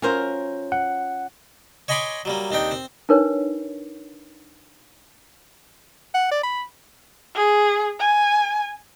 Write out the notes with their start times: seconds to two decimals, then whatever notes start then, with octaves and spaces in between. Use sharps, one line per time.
0.02 F#3 C#4 F4 A#4 C5
0.72 F#5
1.88 C#5 D#5 G#5 B5 C6 D6
2.25 F#3 G3 A#3
2.51 D#2 C4 D4 D#4 G5
2.71 C4
3.09 D4 D#4 A#4 B4 C#5
6.14 F#5
6.31 D5
6.43 B5
7.35 G#4
8.00 G#5